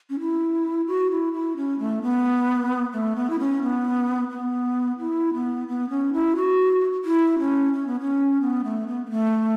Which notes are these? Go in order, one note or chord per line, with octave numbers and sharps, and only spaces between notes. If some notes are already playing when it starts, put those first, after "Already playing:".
C#4
E4
F#4
E4
E4
C#4
A3
B3
A3
B3
E4
C#4
B3
B3
E4
B3
B3
C#4
E4
F#4
E4
C#4
C#4
B3
C#4
B3
A3
B3
B3
A3